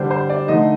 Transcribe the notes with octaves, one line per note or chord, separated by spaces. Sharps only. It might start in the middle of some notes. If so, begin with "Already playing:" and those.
Already playing: D3 G3 D4 C5
C5
D5
D3 A3 D#4 D#5